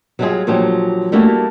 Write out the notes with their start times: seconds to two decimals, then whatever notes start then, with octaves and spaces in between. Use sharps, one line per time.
0.19 F#3 G3 D4 E4 F4 G#4
0.47 A#2 F3 F#3 D4 G4
1.12 G3 A3 A#3 D4 E4 F#4